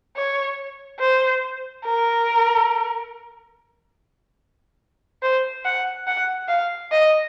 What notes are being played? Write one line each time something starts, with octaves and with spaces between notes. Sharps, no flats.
C#5
C5
A#4
C5
F#5
F#5
F5
D#5